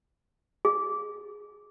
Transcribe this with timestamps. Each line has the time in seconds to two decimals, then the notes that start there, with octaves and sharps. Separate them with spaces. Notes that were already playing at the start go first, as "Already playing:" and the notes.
0.65 G#4